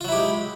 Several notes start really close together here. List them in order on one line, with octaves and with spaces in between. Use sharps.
F4 F#3 E4 G4 G#3